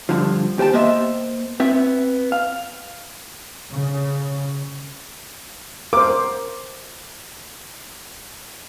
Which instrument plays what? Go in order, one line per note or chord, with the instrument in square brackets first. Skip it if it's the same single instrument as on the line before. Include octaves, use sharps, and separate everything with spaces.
[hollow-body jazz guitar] G2 D3 F3
D#2 G4 C5 G5 A5
A#3 B3 C5 D#5 E5
B3 C4 E5
F5
[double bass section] C#3
[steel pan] A#4 C5 [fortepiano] D6